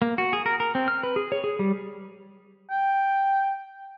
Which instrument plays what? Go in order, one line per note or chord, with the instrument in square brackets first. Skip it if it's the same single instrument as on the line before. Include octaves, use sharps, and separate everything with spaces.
[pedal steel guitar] A#3
F#4
G#4
A#4
A#4
C4
F6
B4
G#4
C#5
G#4
G3
[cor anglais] G5